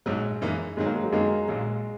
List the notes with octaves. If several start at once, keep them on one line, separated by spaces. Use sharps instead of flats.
A#1 G#2 F#3 G#3
F#2 E3 A#3 D#4
G#2 D#3 F#3 G#3
A#3
G#3
F#3
F#2 D#3 G#3 A#3
A#1 A#2 F#3 G#3